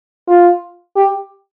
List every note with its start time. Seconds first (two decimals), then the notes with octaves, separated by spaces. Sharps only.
0.28 F4
0.96 G4